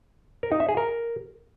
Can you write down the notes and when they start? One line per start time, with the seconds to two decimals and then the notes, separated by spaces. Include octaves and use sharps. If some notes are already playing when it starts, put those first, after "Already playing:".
0.43 A#4
0.52 D#4
0.60 E5
0.69 G#4
0.77 A#4